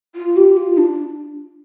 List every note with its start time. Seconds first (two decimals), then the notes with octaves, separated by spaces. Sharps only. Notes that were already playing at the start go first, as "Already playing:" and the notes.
0.15 F4
0.37 G4
0.57 F4
0.78 D4